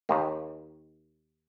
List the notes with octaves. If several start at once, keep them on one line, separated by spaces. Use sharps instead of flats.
D#2 D#3 A#3